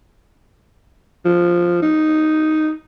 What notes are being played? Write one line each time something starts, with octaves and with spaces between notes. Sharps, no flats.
F3
D#4